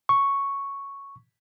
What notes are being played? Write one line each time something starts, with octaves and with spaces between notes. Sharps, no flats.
C#6